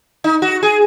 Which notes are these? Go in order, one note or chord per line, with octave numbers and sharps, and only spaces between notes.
D#4
F#4
G#4